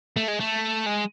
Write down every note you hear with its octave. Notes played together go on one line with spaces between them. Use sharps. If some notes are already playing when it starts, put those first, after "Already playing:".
A3
G#3
A3
G#3